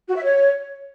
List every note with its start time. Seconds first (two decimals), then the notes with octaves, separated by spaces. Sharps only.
0.09 F#4
0.16 E5
0.23 C#5